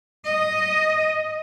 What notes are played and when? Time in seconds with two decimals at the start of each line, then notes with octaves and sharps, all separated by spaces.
0.24 D#5